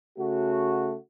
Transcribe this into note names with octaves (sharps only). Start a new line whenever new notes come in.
C#3 A3 F#4